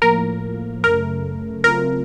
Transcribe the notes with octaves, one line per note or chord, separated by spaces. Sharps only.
A2 F3 A#3 A#4
F#2 C#3 A3 A#4
C#3 F#3 A3 C4 F4 A#4